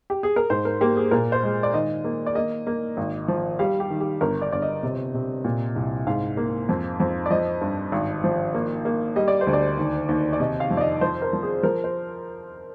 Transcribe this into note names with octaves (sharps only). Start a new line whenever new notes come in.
G4
G#4
A#4
G#2 C5
A#4
A#3 G4
G#4
A#2 A#4
C5
G#3
D5
D#3 D#5
A#3
D5
A#3 D#5
A#3
G#1
F3
G3 F5
G4
D#3
G4
G1 A#4
D5
G1 D5
D#5
C3
C3
A#2
C2
G#2 F5
A#3
F2
F2
D5
F3 D#5
G2
G#1
F3
A#3
A#3
G3 D#5
D5
C5
D2
D5
D#2
D#2
D5
C3 D#5
F5
F2
D5
D#5
F3 C5
A#4
F3
G#4
F3 A#4
C5